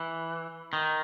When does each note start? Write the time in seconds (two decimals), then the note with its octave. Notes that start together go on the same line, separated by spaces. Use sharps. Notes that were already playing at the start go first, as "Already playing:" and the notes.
Already playing: E3
0.73 D#3